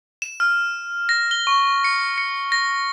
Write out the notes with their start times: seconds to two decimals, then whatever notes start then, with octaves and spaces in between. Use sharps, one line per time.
0.22 E7
0.40 F6
1.09 A#6
1.31 G7
1.47 C#6
1.84 C#7
2.18 C#7
2.52 A#6